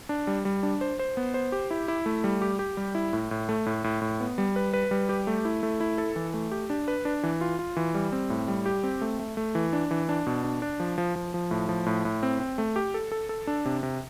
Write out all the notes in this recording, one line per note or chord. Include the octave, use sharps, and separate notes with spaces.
D4
G3
G3
D4
C5
C5
B3
C5
G4
E4
E4
A3
G3
G4
G4
G3
E4
A2
A2
A3
A2
A2
A2
B3
G3
B4
B4
G3
G4
A3
E4
A3
E4
A4
E3
A3
G4
D4
B4
D4
E3
F4
F4
E3
G3
C4
A2
G3
G4
C4
A3
A3
A3
E3
D4
E3
D4
B2
D4
D4
F3
F3
F3
F3
A2
F3
A2
A2
C4
C4
A3
G4
A4
A4
A4
D4
C3
C3